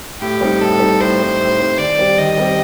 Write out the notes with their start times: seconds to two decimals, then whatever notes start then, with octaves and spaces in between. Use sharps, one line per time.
0.21 A2 G4
0.41 G3 C4 D#4
0.61 A2 A4
0.80 G3 C4 D#4
1.00 A2 C5
1.20 G3 C4 D#4
1.40 A2
1.59 G3 C4 D#4
1.78 D#3 D5
1.99 G3 C4 G4
2.18 D#3 D#5
2.38 G3 C4 G4